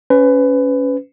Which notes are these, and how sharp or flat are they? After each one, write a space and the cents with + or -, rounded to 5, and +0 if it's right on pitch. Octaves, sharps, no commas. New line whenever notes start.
C#4 +10 B4 +25